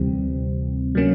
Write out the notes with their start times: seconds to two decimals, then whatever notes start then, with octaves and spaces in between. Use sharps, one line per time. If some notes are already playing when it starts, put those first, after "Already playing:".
Already playing: D2 C3 E3 G3 C4
0.95 F#3 A#3 C#4